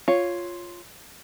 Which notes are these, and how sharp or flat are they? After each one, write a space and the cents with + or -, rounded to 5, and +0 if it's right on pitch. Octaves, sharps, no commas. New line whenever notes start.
F4 +0 C#5 +0